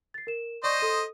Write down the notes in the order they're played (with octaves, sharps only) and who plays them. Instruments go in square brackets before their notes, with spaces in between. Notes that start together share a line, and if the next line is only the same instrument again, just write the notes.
[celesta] A6 C7
A#4 E7
[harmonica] C5 D#5 [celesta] D5 C#6 G6
[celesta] A4 D#6 D#7